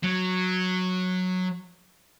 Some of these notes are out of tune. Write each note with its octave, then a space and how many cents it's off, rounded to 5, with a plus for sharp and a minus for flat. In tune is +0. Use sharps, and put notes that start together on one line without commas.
F#3 -10